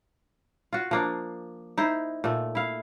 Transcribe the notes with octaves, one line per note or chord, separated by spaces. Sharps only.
F4 F#4
F3 A#3 D4
D#4 E4 C5
A#2 A3
E4 F5